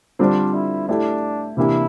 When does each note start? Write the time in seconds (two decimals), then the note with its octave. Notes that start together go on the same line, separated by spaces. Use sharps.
0.19 D3 G3 C4 D4 F4 C5
0.54 E4
0.89 A3 D4 E4 G4
1.57 C3 E3 A#3 D4 E4 G4